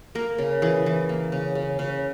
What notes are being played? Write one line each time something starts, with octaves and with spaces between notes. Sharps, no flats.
A#3 A#4
C#3
E3 G#4
E3
A#3
C#3
C#3
C#3